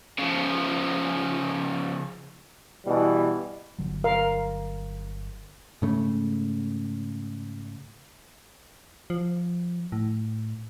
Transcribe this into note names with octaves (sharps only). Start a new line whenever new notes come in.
C#3 F3
B2 E3 G3
G1 D3 F#3
A#4 F5
G#2 C#3 A3
F3
A2